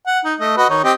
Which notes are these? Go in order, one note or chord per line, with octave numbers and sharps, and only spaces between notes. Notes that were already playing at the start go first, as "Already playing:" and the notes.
F#5
D#4
A3 D#5
F#4 B4 D#5
D#3 D#4 C#5
C4 G4 D#5